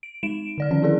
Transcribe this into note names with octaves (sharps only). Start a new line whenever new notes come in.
D7
G#3 D#4 D7 E7
D3 D5 F6
D#3 F3 C#4 D5
C4 C#4 E4 G#4 A#4 D5